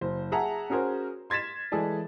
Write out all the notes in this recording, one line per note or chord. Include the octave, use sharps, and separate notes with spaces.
F#1 C5
G#4 E5 F#5 A5 A#5
C#4 F#4 G#4 A#4 C5
C6 G#6 A6 B6 E7
E3 G#3 G#4 A4 D5